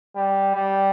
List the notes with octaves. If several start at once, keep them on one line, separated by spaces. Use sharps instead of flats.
G3
G3